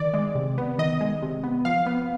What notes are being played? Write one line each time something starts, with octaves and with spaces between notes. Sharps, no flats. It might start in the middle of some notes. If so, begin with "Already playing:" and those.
Already playing: D#3 D5
G#3
C3
B3
D#3 D#5
G#3
C3
B3
F3 F5
B3